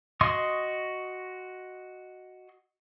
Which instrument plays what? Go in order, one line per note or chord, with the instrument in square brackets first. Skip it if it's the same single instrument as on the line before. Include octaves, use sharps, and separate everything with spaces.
[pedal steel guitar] F#4 D#5 C6 C#6 D#6